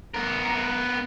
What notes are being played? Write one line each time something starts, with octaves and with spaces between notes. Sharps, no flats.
B3 A#4